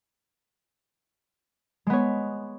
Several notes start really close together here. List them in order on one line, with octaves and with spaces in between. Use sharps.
G#3 B3 C#5